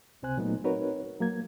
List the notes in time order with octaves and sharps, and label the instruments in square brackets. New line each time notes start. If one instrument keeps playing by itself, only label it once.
[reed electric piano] C#2 C3 C4 C5 G#5 F#6
A#2 F#3 A3 B3 D#4
C4 D#4 F#4 A#4 B4 C#5
F#3 A#3 G#6